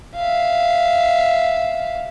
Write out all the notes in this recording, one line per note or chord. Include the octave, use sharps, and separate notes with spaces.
E5 F5